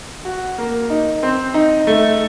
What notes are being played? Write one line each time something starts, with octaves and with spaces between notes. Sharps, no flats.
F#4
A#3
D#4
C4
D#4
A3